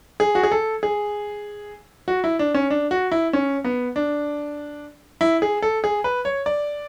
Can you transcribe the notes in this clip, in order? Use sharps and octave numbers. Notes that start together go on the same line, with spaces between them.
G#4
F#4
G#4
A4
G#4
F#4
E4
D4
C#4
D4
F#4
E4
C#4
B3
D4
E4
G#4
A4
G#4
B4
C#5
D5